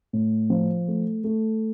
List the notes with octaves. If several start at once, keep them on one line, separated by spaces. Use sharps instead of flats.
A2
F3
A3
A3